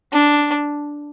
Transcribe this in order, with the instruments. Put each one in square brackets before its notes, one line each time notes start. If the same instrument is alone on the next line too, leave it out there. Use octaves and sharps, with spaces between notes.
[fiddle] D4